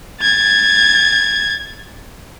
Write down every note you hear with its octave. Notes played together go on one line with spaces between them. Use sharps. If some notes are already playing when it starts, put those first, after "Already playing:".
G#6 A6